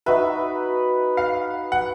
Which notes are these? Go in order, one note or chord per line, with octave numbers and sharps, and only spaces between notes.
D#4 F#4 B4 E5
F5
F#5